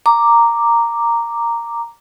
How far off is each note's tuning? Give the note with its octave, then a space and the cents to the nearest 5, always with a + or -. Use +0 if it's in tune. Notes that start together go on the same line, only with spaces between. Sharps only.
A#5 -5 D6 +0